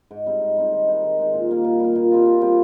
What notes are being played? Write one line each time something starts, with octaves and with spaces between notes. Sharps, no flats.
G#2
G3 C4 D#4
G#2
G3 C4 D#4
D#3
G#3 D#4
D#3
G#3 D#4
A#2
G3 A#3
A#2
G3 A#3
A#2
G3 C4 F4
A#2
G3 C4 F4